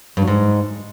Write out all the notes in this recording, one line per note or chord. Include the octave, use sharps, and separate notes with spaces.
G2
F#3
G#2